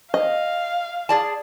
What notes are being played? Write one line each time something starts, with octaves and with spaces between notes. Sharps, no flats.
D#5 F5
G#4 D5 A5